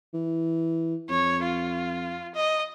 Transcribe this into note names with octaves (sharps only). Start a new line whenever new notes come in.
E3
F2 C#5
F4
D#5